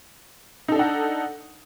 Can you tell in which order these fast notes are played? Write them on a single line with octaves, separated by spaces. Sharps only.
D#4 A4 D4 F#5